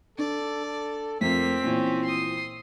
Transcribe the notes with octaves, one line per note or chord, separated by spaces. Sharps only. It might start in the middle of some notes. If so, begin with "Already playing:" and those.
D4 A4 D5
A4
F2 A3 A#3 C4 B6
A#2 E3 C#4
C6 D#6